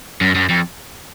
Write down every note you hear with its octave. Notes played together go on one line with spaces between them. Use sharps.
F#2
F#2
F2